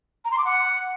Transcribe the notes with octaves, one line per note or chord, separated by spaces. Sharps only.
A#5
C6
D6
F#5